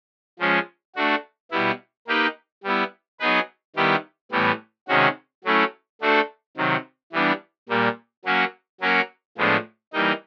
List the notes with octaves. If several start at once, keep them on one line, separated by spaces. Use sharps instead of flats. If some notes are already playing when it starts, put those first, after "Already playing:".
F3 G#3 C#4
A3 D4 F#4
B2 G3 B3 E4
A#3 D#4 G4 B4
G3 B3 E4
F#3 B3 D#4 G#4 B4
D#3 G3 B3 E4 G4
A2 E3 G3 B3
C3 D#3 G#3 C#4 F#4
F#3 A3 C#4 E4
A3 D4 F#4 A4 C5
C3 D#3 F#3
E3 G3 B3 D4
A#2 G3 A#3
F#3 A#3 C#4 F#4
F#3 A#3 C#4 F#4 A#4
A2 F3 G#3 B3 D4
E3 G3 A#3 D#4